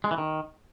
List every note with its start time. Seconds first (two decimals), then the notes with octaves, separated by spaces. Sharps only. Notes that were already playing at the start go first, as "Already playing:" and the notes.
0.04 G#3
0.11 E3
0.18 D#3